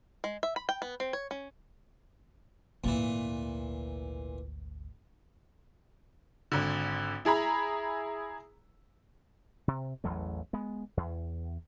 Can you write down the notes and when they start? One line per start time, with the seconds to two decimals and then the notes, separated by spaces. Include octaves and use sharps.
0.24 G#3
0.43 E5
0.56 B5
0.69 G5
0.82 B3
1.00 C4
1.13 C#5
1.31 C#4
2.84 G#1 D2 A#2 E3
6.52 G#1 D3
7.25 E4 G#4 A#5 B5
9.68 C3
10.04 A1 E2 F#3 A3
10.53 G#3 B3
10.97 E2